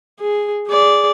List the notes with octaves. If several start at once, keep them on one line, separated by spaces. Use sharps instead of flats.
G#4
G#4 D5